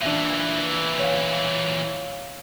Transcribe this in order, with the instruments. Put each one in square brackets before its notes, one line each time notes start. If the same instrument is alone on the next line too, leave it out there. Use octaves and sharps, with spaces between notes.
[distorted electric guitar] A#2 E3 [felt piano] D4 E5
[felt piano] C#5 F5